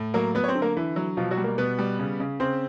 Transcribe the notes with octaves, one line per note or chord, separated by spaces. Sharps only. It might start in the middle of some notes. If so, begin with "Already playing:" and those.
Already playing: A2
F#3 A#3 A#4
F#3 B3 B4
C#5
C4 C5
D3
A#3 A#4
D3 E3 E4
F#3
B2 F3 F4
F#3 F#4
G3
A#3 A#4
B2 B3 B4
G3
C#3
C#3
C#3 C4 C5